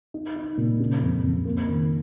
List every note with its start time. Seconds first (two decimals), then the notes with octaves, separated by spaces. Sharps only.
0.14 D#4
0.36 D#4
0.58 A#2
0.80 C#3
1.02 F2
1.24 F2
1.45 A#3
1.67 D#3